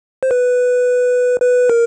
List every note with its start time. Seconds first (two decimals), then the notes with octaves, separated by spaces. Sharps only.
0.23 C5
0.31 B4
1.41 B4
1.70 A#4